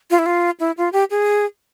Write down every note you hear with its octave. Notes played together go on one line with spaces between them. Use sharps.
F4
E4
F4
E4
F4
G4
G#4